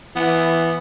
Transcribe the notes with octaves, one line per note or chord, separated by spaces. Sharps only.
E3 B3